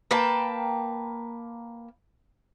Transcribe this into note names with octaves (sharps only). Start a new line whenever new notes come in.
A#3 B4 G5 A5